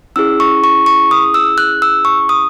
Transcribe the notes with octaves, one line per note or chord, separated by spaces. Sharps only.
C#4 E4 G#4 E6
C#6
C#6
C#6
D#6
E6
F#6
E6
C#6
D#6